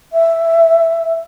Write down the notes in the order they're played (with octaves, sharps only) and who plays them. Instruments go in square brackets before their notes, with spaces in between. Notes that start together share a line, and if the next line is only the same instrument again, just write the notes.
[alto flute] E5